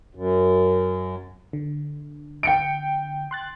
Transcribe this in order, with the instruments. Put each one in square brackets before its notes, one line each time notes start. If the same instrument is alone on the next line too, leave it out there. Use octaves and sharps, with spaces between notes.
[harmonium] F#2
[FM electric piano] D3
[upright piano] G5 C#7 D7
[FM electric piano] C6 F#6 A6